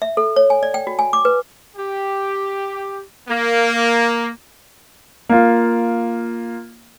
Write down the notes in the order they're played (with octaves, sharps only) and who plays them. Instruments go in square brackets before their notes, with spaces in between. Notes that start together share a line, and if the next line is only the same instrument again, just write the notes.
[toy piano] E5
A4
C#5
G#5
D5
G5
F#4
G#5
D6
B4
[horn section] G4
A#3
[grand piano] A#3 F4